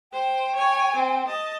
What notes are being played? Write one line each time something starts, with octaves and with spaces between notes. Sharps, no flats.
C5 G5
C#5 G#5
C4
D#5 A5